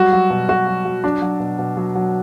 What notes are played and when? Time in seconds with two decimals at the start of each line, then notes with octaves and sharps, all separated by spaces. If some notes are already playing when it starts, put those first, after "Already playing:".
Already playing: F#3 G3 F#4
0.12 F#3
0.30 B2
0.49 B2 F#4
0.67 F#3
0.85 F#3
1.03 F#3 D4
1.22 F#3
1.40 B2
1.59 B2
1.77 F#3
1.95 F#3